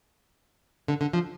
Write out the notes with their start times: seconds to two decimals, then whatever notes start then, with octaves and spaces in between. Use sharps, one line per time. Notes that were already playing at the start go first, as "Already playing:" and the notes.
0.88 D3
1.01 D3
1.13 F3